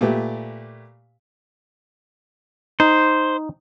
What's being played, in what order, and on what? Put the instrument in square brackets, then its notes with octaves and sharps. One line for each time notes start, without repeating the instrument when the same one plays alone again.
[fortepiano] A#2 A3 G4 B4
[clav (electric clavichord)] D#4 [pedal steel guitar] C5